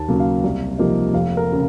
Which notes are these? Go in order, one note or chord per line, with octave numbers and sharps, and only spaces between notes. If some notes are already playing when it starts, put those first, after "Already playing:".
Already playing: D#2 A5
C#3 F#3 A#3
F5
C2
C3 F3 A#3 D#4
F1 F5
A#4
C#3